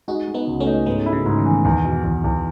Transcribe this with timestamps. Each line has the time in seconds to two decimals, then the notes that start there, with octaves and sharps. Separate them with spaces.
0.08 G#3 D#4 F#4
0.28 G#3
0.34 B3 D#4
0.47 C#2
0.60 A3 C#4
0.67 D#4
0.86 G#2 G#3 B3
1.06 E4
1.13 C#3
1.26 G#2
1.39 D#3
1.45 E3
1.65 E2 D#3
1.84 B2
2.04 E2
2.24 E2